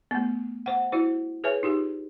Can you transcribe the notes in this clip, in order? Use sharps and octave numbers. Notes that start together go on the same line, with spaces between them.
A3 B3
C5 F#5
E4 F#4 C5
G#4 B4 C#5 E5 G#5
D#4 F4 G4